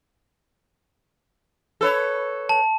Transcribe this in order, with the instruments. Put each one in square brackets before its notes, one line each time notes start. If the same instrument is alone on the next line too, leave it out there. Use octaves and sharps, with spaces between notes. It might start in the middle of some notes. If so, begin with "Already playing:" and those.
[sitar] A4 B4 C#5
[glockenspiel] A5